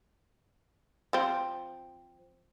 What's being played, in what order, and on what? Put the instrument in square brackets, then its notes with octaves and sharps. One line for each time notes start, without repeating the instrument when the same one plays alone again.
[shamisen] F3 C4